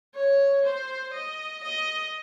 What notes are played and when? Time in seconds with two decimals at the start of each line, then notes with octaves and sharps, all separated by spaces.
0.14 C#5
0.65 C5
1.14 D#5
1.63 D#5